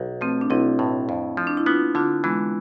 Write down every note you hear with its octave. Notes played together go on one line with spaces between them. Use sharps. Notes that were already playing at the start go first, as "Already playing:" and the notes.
Already playing: B1
F3 A3 C4
D4
B1 C4 E4
A2
F2
F3
D4
E4
B3 D4 F4
D3 D4 F4
E3 G#3 B3